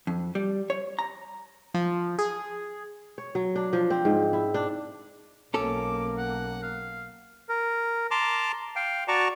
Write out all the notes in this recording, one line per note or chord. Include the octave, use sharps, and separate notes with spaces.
F2
G3
C#5
A#5
F3
G#4
C#5
F#3
D4
F3
C4
G#2
E4
D4
B1 A#3 C#4 A4 D6
F#5
F5
A#4
A5 A#5 C6 D6
F5 G5
F#4 D5 A5 A#5 C#6